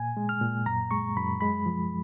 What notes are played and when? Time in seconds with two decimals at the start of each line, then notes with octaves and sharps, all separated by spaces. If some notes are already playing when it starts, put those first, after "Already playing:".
Already playing: A#2 G#5
0.17 G#3
0.29 F6
0.42 A#2
0.66 F#2 A#5
0.91 G#3 C#6
1.16 F#2 B5
1.41 G#3 B5
1.66 F3